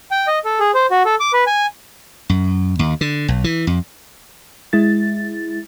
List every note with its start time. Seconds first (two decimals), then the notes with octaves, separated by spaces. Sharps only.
0.11 G5
0.27 D#5
0.45 A4
0.60 G#4
0.74 C5
0.91 F#4
1.05 A4
1.20 D6
1.33 B4
1.47 G#5
2.29 F#2
2.79 D#2
3.01 D3
3.28 B1
3.44 E3
3.67 F2
4.73 G#3 E4 A6